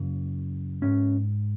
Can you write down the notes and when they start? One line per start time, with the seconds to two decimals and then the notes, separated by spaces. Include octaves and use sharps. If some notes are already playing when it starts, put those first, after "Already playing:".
Already playing: F#2 C#3
0.82 G#2 C#4